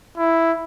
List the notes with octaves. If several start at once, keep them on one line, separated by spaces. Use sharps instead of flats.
E4